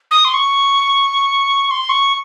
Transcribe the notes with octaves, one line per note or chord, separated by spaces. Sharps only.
D#6
C6
C#6
C#6
C6
C#6